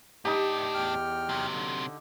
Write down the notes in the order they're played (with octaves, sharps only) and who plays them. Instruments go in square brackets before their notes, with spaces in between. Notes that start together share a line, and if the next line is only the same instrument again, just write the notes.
[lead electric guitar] A2 D4 [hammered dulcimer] D#4 G4
[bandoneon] E2 G5 F6
[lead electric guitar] C3 F#3
[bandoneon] D3